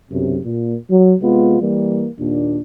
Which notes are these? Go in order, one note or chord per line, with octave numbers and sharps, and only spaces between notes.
B1 F#2 C3
A#2
F#3
C3 G#3 B3 F4
E3 G3 A#3
D#2 A#2 D4